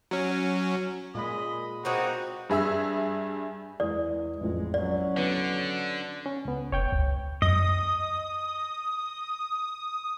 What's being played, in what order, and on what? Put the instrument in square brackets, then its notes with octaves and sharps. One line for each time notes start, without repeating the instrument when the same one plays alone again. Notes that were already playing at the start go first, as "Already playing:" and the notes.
[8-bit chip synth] F#3 C#4
[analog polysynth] A#2 G#3 B5 [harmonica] D#5
[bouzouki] A#3 C4 G#4 [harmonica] D#4 [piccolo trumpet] F#4
[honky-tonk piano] G2 G#4 E5 E6
[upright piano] E2 D#6 [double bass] G#3 [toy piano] D5
[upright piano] A1 F2 [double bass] G#3
[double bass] F#3 C#4 [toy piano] D5
[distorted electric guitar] D3 [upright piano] B3
[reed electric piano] C#4
C#2 B3
[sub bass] F1 [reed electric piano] C#5 G5 G6
[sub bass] C#2
[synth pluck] F#2 [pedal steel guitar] D#5 [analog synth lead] D#6